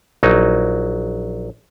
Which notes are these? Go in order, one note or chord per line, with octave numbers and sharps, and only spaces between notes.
A#1 F#3 D#4